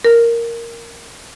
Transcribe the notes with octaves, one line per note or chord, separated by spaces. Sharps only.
A#4